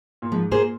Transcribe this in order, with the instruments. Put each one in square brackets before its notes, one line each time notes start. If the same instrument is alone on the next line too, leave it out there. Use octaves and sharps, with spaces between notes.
[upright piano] A#2
[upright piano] G#2 [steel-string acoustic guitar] F3
[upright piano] A#2 [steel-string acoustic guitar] A#3 G#4 C5